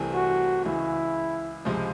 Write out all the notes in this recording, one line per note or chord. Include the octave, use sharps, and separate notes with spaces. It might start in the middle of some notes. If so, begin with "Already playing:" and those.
Already playing: C2 C3 E3 A3 C4
F#4
C#2 C#3 E3 G#3 E4
C#2 C3 F3 G#3